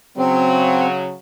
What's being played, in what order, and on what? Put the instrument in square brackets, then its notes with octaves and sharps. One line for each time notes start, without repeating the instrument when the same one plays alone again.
[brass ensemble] C#3 F#3 [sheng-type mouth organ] C4